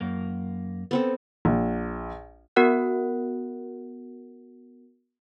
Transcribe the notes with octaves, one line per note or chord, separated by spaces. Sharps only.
F#2 A#3
B3 C4 A4
A#1
B3 F#4 A#4 F#5 F#6